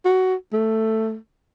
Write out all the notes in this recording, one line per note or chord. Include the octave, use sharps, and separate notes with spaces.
F#4
A3